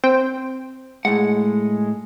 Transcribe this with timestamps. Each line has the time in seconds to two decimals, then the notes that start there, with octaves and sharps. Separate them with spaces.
0.04 C4 C5 G5
1.05 A2 G#3 F#5